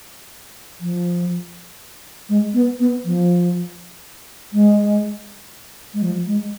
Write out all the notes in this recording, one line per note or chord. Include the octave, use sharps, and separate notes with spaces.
F3
G#3
B3
B3
F3
G#3
G#3
F3
G#3